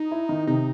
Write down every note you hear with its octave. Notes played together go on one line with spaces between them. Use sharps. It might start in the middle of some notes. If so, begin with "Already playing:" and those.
Already playing: D#4
E4
D#3
C3 D#4